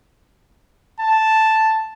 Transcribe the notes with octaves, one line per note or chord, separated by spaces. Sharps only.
A5